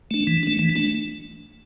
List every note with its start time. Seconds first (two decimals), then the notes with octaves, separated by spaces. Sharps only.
0.11 A3 D4
0.27 E3
0.43 A3 D4
0.59 E3
0.75 A3 D4